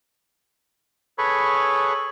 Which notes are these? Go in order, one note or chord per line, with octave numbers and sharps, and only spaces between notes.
G#4 A4 B4 C#5 B5 C#6